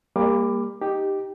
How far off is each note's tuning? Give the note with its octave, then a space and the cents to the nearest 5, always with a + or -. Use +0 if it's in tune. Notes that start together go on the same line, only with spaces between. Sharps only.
G3 +30 A#3 +0 D6 +10
D#4 -5 G4 +0